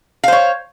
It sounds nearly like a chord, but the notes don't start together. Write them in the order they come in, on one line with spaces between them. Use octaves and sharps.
F5 C5 C#5